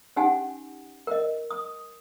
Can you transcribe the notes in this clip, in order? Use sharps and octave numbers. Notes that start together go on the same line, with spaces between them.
C#4 D#4 G4 F#5 G#5
A#4 D#5
D#6